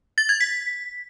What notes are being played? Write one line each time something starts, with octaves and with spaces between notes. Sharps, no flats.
A6
G#6
B6